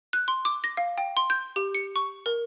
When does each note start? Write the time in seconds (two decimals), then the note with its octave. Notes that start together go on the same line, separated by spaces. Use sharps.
0.13 F#6
0.28 C6
0.45 D6
0.64 A#6
0.77 F5
0.98 G5
1.17 C6
1.30 G6
1.56 G4
1.75 C#7
1.96 C#6
2.26 A#4